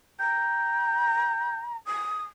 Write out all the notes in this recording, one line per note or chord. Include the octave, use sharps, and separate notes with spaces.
G5 A#5
D#6